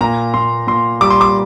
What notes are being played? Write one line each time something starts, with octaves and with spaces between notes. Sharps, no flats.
A#2 A#5
A#2 C6
A#2 C6
G3 D6
C6
D6